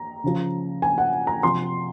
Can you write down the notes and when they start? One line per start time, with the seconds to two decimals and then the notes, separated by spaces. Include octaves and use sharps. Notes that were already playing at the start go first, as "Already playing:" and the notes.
Already playing: A#5
0.24 C#3 F3
0.82 G#5
0.98 F#5
1.27 A#5
1.43 C3 F3 C6